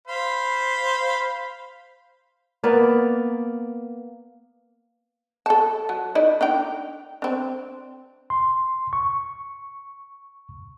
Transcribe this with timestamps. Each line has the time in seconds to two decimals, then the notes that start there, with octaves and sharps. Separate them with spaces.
0.08 C5 F5 B5
2.64 A#3 B3 B4 D5
5.46 A4 A5
5.89 F#3
6.15 D#4 E4 D5
6.41 D4 D#4 G5
7.22 C4 D4
8.30 C6
8.93 C#6